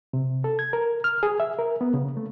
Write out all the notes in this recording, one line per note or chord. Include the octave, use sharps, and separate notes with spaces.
C3
A4
G#6
A#4
F6
G#4
E5
A#4
B3
C#3
A3